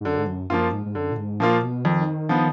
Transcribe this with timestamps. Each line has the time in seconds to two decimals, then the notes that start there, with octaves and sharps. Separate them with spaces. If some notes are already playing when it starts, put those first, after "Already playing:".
0.01 G#2
0.05 F#2 D3
0.18 G#2
0.27 F#2
0.50 F#2 F3 A#3 F4
0.72 G#2
0.86 G#2
0.95 F#2 D3
1.11 A#2
1.17 G#2
1.40 A#2 F3 A#3 F4
1.63 B2
1.85 F2 D#3
2.29 F3 B3